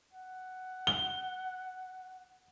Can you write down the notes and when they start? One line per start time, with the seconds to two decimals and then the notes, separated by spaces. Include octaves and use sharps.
0.13 F#5
0.87 G7